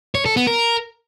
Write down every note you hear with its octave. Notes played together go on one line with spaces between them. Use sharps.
C#5
A4
B3
A#4